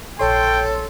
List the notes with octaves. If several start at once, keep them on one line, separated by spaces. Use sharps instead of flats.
A#1 A4 C#5 G5 C6